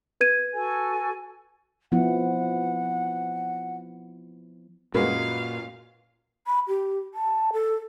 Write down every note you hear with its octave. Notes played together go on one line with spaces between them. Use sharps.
B4 G#6 D#7
F#4 A4 G#5
F3 B3 E4 F#5
F#2 A#2 G#3 A#3 F#4 B4 F5
B5
G4
A5
A4